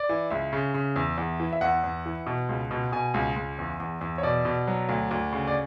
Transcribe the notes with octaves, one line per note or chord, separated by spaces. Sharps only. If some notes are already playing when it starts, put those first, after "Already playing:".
Already playing: D5
E3
C#2 E5
C#3
C#3
E2
E2
E3
E5
E2 F#5
E2
E3
B2
C#2
B2
B2 G#5
C#2
C#2
E2
E2
E2
C#5
B2 D5
B2
F#3
D2
D2
C#3
D5